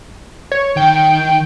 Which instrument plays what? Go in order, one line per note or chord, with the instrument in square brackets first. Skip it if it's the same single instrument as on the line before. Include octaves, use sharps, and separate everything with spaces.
[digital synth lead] C#5
[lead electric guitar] D#3 [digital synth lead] G5